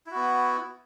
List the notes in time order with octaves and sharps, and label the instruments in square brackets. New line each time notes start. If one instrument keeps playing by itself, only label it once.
[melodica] E4
F#4
B3